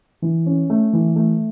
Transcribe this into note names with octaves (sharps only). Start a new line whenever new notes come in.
E3
C#4
A3
E3
A3